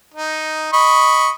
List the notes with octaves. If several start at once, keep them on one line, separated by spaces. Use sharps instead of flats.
D#4
D#5 B5 C#6